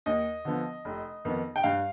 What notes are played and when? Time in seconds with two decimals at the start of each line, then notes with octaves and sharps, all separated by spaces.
0.06 D#2 D#5
0.45 D3 F3 B3
0.85 F1
1.25 F2 D#3 B3
1.56 G5
1.64 G2 F5